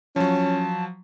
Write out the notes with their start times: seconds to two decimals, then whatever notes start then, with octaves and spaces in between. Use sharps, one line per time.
0.16 F3 F#3 C#4 A5